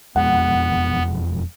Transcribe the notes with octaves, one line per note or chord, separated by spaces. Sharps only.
E1 F2 G#3 B3 F#5